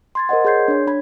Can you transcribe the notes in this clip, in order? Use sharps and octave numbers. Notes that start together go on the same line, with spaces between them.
C6 G#6 A6
A#4 C5 D#5 F#5
G#4 C#5 C6 G6 G#6 C7
D4 C#5
D4 B5 G#6